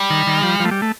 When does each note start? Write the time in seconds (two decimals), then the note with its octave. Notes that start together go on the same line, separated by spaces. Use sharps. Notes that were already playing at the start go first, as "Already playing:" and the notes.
Already playing: G3
0.10 D#3
0.27 D#3
0.43 F3
0.60 F3
0.65 A3
0.71 G3
0.82 A3